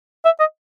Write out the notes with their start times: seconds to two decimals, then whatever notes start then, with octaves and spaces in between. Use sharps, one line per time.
0.25 E5
0.39 D#5